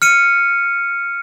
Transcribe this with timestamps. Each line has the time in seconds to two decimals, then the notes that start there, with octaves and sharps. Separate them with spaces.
0.02 F6 C#7 D#7